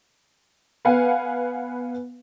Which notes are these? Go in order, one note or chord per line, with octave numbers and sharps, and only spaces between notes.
B3 B4 F5 F#5 G#5